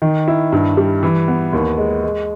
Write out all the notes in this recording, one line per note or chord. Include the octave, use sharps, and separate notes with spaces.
D#3
E4
G2
G3
E3
B3
D#2
G#3
G#3